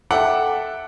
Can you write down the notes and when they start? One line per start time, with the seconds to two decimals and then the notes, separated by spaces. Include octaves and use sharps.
0.11 A4 E5 F#5 G5 D6